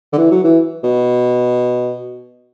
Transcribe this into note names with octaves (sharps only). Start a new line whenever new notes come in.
D3
E3
F#3
E3
B2